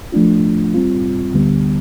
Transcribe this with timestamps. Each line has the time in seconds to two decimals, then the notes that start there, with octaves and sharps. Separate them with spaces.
0.12 F3 A3 D4 F4
0.74 G3 C4 F4
1.34 D2 D3 G3 B3